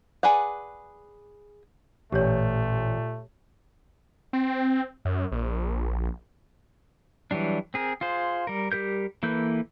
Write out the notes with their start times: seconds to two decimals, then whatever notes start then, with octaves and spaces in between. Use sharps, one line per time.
0.23 G#4 B4 D5 F#5
2.12 A1 A#2 A3 G4 C#5
4.33 C4
5.05 F#2
5.32 A#1
7.31 E3 F#3 G3 D4
7.74 C4 G#4 A#4
8.01 F4 G#4 C5
8.47 G3 A#4
8.72 G3 G4 A#4 G6
9.23 E3 A#3 A4 B4 G6